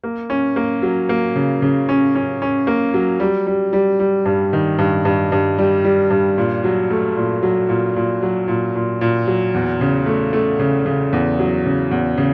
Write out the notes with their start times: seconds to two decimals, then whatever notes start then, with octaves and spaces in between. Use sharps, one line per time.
0.04 A#3
0.30 C#4
0.56 A#3
0.82 F#3
1.09 A#3
1.36 C#3
1.62 C#3
1.89 C#4
2.15 C#4
2.42 C#4
2.67 A#3
2.94 F#3
3.20 G3
3.47 G3
3.73 G3
4.00 G3
4.25 G2
4.53 D#3
4.78 G2
5.05 G2
5.32 G2
5.58 G3
5.84 G3
6.10 G2
6.38 A#2
6.64 F#3
6.91 A3
7.17 A#2
7.43 F#3
7.69 A#2
7.96 A#2
8.22 F#3
8.48 A#2
8.75 A#2
9.01 A#2
9.27 F#3
9.54 E2
9.81 C#3
10.06 A3
10.33 A3
10.59 C#3
10.86 C#3
11.13 E2
11.39 F#3
11.66 C#3
11.91 E2
12.17 C#3